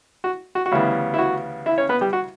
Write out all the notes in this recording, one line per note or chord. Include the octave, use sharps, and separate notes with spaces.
F#4
F#4
F#4
D2 C#3 E3 G3 B3 E4
E4
F#4
E4 E5
C#4 C#5
B3 B4
G3 G4
F#4